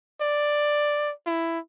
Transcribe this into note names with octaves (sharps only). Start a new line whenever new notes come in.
D5
E4